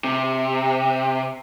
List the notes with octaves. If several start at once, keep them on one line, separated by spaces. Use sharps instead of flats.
C3